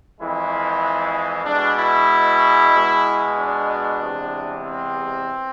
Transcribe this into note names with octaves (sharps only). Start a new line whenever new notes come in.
F2 E3 G#3 E4
B2 G#3 D4
E4
B2 G#3
D4
E2 C3 G#3
C4